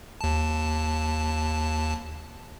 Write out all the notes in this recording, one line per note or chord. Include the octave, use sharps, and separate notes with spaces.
D#2 A5